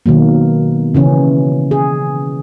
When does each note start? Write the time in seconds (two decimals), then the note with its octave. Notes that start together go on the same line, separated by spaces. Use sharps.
0.06 B2 D#3 F#3 A#3
0.95 C#3 E3 C#4
1.71 G#4